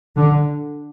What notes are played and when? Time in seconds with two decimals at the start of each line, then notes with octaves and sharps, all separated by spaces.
0.16 D3